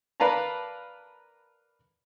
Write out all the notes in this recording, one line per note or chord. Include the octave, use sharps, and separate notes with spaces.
A#4 B4 D5 F5 A5 A#5